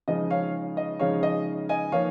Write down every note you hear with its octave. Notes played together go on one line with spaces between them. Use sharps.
C#3 F3 G#3 D#4 D#5
C#5 F5
D#5
C#3 F3 G#3 D#4 C#5 F5
D#5
D#5 G#5
F3 A#3 D#4 C#5 F5